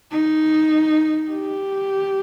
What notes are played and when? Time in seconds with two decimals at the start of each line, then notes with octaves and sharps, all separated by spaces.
0.12 D#4
1.32 G4